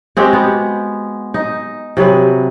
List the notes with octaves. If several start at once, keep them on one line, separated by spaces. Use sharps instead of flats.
G#3 C4 F#4 G4
B3
D#4
C3 F#3 G#4 B4